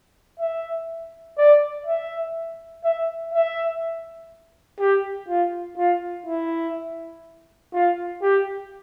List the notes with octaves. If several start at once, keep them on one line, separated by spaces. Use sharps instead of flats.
E5
D5
E5
E5
E5
G4
F4
F4
E4
F4
G4